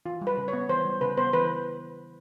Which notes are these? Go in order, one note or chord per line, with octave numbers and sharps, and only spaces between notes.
E3 F4
G3
B4
C#3
C#5
B3
E3 C5
G3
C#3 B4
B3 C5
E3 B4